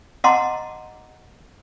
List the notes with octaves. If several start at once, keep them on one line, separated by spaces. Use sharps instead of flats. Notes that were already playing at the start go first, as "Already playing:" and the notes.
D#5 F#5 A5 A#5 C6 D6